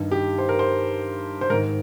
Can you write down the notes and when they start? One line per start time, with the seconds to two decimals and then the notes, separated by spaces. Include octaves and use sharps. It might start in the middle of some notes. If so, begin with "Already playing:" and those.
Already playing: G2 D#3
0.11 G4
0.39 C5
0.49 A#4
0.59 C5
1.41 C5
1.50 G#2 A#4
1.53 D#3